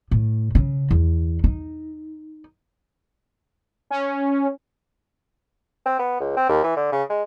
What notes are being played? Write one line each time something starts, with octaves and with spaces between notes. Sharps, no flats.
A2
C#3
E2
D#4
C#4
C4
B3
C#2
C4
D#2
E3
D3
C#3
G#3